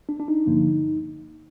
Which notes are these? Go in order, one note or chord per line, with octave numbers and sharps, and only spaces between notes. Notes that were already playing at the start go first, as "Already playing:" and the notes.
D4
D4
D#4
G2 D3 F3 A#3